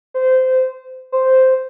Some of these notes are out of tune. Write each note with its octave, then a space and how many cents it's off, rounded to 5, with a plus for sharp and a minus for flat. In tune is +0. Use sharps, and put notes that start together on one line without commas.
C5 -20
C5 -5